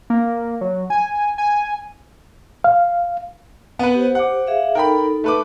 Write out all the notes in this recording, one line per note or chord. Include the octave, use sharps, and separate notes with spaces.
A#3
F#3
G#5
G#5
F5
B3 B4
G4 C5
F#5 D6
G#4 E5 F5
D#4 A4 A#4 G5 B5
A3 B4 D6